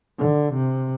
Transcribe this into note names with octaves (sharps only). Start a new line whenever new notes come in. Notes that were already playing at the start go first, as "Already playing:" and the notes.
D3
C3